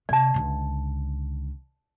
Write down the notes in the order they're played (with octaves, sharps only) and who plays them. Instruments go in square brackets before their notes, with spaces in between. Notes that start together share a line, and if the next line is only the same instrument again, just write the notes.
[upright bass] C3 [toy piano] D5 A5
[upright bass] C#2 D3